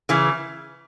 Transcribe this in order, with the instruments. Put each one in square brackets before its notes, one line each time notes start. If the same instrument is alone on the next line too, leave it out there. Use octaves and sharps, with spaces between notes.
[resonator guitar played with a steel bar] C#3 E3